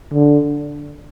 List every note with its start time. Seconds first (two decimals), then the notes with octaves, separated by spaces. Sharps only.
0.14 D3